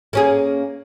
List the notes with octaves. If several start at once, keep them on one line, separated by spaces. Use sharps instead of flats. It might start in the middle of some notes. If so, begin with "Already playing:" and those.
A#3 C#4 G#4